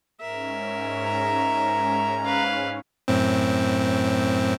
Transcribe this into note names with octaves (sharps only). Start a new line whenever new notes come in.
G#2 C#4 A#4 E5
A#5
B4 F5
F#2 A2 C4